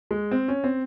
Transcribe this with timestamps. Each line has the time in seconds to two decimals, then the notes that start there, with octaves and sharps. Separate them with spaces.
0.11 G#3
0.31 C4
0.48 C#4
0.64 C4